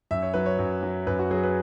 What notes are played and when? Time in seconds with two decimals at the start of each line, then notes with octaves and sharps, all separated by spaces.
0.11 F#2 E5
0.22 C#5
0.34 F#3 B4
0.46 C#5
0.59 F#2
0.83 F#3
1.07 F#2 B4
1.19 F#4
1.31 F#3 G#4
1.44 B4